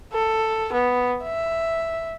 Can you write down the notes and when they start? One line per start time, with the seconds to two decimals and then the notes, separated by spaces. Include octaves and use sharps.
0.13 A4
0.72 B3
1.24 E5